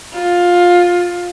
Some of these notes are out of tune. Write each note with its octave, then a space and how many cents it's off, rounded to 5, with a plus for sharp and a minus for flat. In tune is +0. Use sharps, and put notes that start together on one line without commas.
F4 +15